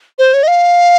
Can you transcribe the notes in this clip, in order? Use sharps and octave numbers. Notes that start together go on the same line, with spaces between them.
C5
C#5
D#5
F5